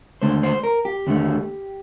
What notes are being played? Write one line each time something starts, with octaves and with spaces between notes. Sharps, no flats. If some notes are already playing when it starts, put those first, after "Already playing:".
D#2 D3 A3 C5
C5
A#4
G4
D#2 D3 A3